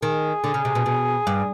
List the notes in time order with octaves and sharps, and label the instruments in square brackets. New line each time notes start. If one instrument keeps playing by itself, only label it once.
[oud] D#3 [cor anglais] G#4
[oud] D3
C#3
C3
B2
B2
G2